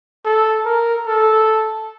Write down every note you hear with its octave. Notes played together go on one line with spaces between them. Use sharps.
A4
A#4
A4